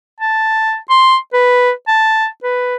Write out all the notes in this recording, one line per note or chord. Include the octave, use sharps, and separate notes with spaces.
A5
C6
B4
A5
B4